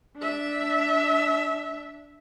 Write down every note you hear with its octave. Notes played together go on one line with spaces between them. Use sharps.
D4 E5